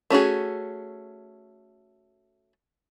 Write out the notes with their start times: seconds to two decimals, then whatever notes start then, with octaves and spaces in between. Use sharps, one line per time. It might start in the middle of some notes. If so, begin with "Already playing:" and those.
0.10 A3 C#4 F#4 G#4